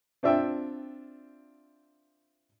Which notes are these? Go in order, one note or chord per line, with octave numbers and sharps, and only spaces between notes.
C4 D4 F4 E5 G5